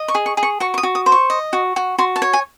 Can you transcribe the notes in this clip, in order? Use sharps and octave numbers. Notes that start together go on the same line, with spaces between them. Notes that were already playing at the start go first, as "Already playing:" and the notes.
Already playing: D#5
C#6
G#4
C#6
G#4
C#6
F#4 C#6
C#6
D#6
F#4
D#6
C5
C#6
D#5
F#4
F#4
F#4 C6
A5
C#5
G#5